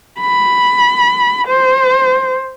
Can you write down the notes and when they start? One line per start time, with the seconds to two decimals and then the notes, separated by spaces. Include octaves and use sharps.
0.20 B5
1.48 C5